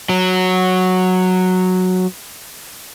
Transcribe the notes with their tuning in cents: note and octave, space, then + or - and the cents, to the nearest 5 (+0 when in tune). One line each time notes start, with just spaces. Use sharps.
F#3 -5